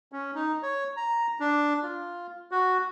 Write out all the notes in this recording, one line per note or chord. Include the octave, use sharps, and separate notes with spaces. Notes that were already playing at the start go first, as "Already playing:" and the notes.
C#4
D#4
C#5
A#5
D4
F4
F#4